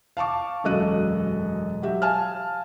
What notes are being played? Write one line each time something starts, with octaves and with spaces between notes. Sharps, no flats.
F5 A5 C#6 D6
E1 F#2 A4 D#5 F#6 D#7
F#3 F#4 G4 E5
F5 G#5 A5 F6